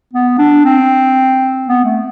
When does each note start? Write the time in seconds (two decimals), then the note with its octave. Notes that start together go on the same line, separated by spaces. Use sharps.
0.13 B3
0.38 D4
0.65 C4
1.68 B3
1.85 A3